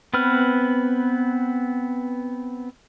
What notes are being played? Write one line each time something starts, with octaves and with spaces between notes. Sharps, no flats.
B3 C4 B4 F6